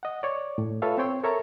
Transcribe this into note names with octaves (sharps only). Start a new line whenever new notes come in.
D#5 F#5
C#5 D5
A2
F4 A4 B4 C#5 E5 F5
C4 C5 C#5 G5 C6
A4 A#4 C#5 E5 A5 A#5